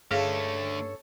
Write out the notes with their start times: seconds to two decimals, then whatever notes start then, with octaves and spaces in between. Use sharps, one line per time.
0.11 G2 D3 A3 C#4 G#4 A4 C#5 F5